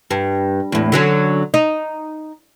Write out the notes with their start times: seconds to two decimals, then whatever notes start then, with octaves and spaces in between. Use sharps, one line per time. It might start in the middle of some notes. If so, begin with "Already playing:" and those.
0.11 G2
0.72 E2 A2
0.92 D3 F#3 C#4
1.54 D#4